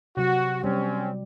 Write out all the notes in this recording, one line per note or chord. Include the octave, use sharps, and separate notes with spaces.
C3 F#3 F#4
G3 C4 C#4